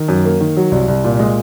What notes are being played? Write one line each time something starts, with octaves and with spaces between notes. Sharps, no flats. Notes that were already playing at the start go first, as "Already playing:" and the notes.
Already playing: D#3
F#2
A#3
D#3
F#3
C2
C2
A#2
G#3